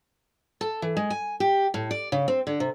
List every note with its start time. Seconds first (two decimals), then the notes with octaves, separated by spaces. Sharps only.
0.61 A4
0.82 E3
0.97 G#3
1.10 G#5
1.40 G4
1.74 A2
1.91 D5
2.12 C#3
2.28 C4
2.47 D3
2.60 C3